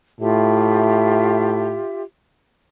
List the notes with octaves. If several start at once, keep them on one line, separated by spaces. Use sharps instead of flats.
A2 F4 G4 E5